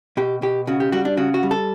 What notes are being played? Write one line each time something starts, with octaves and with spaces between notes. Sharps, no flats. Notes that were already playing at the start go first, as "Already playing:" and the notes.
B2 G4
B2 G4
C#3 F#4
G4
G3 F#4
D4
C#3 F#4
F#4
G3
A4